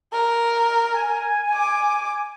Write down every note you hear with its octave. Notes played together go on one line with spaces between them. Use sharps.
A#4
G#5
D6